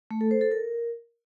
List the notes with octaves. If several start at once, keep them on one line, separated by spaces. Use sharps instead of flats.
A3
A4
C5
A4
A#4